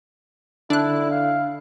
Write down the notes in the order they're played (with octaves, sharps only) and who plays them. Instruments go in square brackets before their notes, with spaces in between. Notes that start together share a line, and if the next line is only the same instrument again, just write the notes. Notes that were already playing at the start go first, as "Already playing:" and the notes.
[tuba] D3 [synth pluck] D4 F#6 [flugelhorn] E4
[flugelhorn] F5